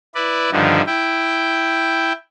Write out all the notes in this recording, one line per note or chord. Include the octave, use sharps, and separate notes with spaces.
E4 B4 D5
G2 D3 D#3 F3
E4 G5